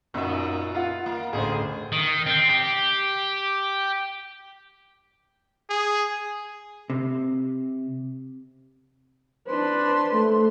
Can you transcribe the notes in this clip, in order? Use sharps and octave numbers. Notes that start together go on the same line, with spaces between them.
F#2 A#2 B3 D#4 E5
F4 F5 F#5
A#3
A1 D2 G#4 C5
D#3
C4
G4
G#4
C3
D4 B4 C5 C6
A3